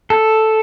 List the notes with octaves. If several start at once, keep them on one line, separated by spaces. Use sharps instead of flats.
A4